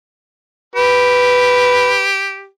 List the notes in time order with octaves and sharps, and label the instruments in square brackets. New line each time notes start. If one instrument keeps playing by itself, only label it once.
[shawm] G4 [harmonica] B4